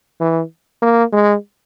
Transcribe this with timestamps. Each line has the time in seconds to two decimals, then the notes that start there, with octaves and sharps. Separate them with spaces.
0.20 E3
0.82 A#3
1.12 G#3